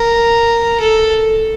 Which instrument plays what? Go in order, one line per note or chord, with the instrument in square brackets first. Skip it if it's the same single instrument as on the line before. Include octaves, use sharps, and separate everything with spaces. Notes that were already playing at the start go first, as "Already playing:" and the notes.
Already playing: [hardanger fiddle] A#4
A4